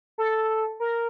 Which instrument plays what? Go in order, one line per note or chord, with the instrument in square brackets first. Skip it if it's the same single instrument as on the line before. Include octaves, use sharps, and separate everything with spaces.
[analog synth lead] A4
A#4